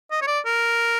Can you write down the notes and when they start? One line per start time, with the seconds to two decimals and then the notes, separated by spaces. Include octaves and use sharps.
0.11 D#5
0.22 C#5
0.27 D5
0.46 A#4